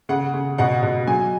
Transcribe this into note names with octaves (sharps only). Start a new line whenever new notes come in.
C#3 F#5
C#3
B2 F#5
B2
F#3 G#5